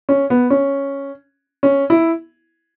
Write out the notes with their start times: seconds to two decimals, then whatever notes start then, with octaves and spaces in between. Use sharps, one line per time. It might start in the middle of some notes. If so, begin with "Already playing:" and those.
0.09 C#4
0.30 B3
0.50 C#4
1.63 C#4
1.90 E4